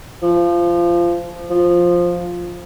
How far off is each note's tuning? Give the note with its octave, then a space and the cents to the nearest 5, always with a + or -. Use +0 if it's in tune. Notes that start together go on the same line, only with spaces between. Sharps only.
F3 -20
F3 +5